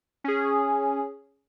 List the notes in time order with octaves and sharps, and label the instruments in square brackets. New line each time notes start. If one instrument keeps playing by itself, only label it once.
[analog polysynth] C#4 G#4